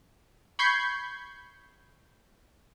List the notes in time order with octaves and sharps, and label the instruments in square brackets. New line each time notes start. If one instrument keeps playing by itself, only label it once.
[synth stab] B5 C#6 G6 G#6 C7